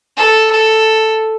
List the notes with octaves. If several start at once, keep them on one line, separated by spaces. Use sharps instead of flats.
A4
A4